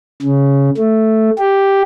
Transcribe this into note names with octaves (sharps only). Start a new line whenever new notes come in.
C#3
A3
G4